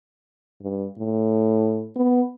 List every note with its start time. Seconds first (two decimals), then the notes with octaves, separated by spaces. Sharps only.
0.62 G2
0.98 A2
1.96 B3